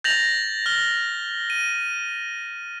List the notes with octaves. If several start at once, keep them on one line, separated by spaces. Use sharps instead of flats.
G6 A6 A#6 F7 F#7
F6 G7
D#7